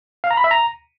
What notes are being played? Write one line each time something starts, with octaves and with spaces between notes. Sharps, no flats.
F5
A#5
B5
E5
A#5